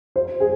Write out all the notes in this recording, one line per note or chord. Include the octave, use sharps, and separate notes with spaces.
C5
G#4